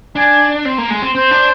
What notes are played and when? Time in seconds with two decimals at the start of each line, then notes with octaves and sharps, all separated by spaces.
0.16 D4 G#5
0.65 C4
0.78 A#3
0.90 G#3
1.02 C4
1.15 C4 C5
1.31 D4